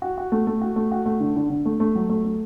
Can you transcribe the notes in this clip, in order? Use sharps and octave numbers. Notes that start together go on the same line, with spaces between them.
F#4
F#4
A3
A3
F#4
A3
F#4
A3
D3
D3
D3
A3
A3
F#3
A3
A3